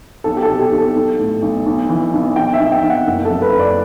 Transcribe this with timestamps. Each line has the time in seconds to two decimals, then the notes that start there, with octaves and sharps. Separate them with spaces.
0.24 B1 A4
0.37 G4
0.42 A4
0.49 B2
0.59 G4
0.72 B1
0.78 A4
0.96 B1
1.19 A2
1.42 B1
1.66 B1
1.89 E3
2.13 B1
2.36 B1 G5
2.54 E5
2.60 B1
2.72 G5
2.83 B1
2.90 F#5
3.07 F#1
3.25 A4
3.30 F#2
3.42 B4
3.55 F#1
3.60 D5